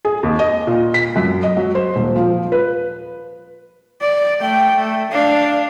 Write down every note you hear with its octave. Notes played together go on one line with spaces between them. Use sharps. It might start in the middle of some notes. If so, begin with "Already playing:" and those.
G#4
D#2
D#5
A#2
B6
F#2
D#5
F#3
C5
D#1
F3
B4
D5
A3 G5
A3
D4 F5